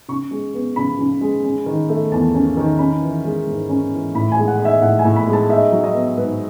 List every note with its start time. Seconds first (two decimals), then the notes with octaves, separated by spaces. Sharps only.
0.08 C#3 C#6
0.31 G#3
0.54 B3
0.76 C#3 B5
0.99 C#3
1.21 G#3
1.44 C#4
1.66 D#3
1.90 A3
2.12 E2 A5
2.35 C#4
2.57 D#3
2.79 C#4 B5
3.02 E3
3.24 G#3
3.47 G#2
3.69 C#4
3.92 E3
4.14 A2 B5
4.32 G#3 G#5
4.48 F#5
4.59 D#4
4.65 E5
4.82 A2 F#5
4.99 G#5
5.05 A2
5.16 B5
5.27 G#3
5.33 A5
5.49 D#4 E5
5.72 F#3
5.84 D#5
5.94 B3
6.17 G#2 B4